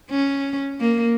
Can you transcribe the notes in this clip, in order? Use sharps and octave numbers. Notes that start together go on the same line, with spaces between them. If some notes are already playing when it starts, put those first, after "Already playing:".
C#4
A#3